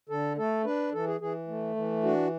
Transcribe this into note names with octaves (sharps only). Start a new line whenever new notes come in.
D3 A4
A3 A4
D4 B4
E3 A4
G#4
E3 G#4
A3
E3
D4 F#4